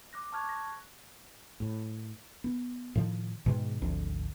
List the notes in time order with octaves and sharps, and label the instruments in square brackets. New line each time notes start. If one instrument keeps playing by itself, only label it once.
[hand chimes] D6 F#6 A#6
A5 C#6 F6 F#6 G#6
A#6
[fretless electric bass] A2
B3
A2 D#3 F3
G#2 B2 D#3 G#3
G#1 D2 F3 C4